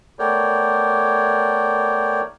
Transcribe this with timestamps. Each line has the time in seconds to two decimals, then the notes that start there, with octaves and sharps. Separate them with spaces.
0.19 A3 B3 A#4 C#5 D5 G5